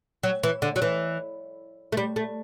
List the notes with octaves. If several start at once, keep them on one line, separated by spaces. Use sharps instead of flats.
F#3
E3
D3
F#3
E3
A3
G3
A3